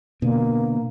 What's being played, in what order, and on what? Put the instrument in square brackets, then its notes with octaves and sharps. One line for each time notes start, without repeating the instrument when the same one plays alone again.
[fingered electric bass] B2 D3 [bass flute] A#3